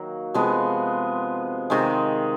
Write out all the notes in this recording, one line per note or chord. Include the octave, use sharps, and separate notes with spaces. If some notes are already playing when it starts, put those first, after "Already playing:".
Already playing: D#3 F#3 A#3
C3 F3 G#3 B3
C3 D#3 G#3